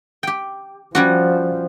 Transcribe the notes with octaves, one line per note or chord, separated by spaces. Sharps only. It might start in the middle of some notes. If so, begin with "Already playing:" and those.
G4 G5
F3 G3 C#4 F#4